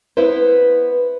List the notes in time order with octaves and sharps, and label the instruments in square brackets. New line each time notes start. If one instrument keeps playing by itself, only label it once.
[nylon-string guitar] B3 E4 B4 C5